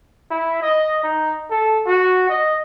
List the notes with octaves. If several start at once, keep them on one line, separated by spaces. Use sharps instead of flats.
E4
D#5
D#4
A4
F#4
D#5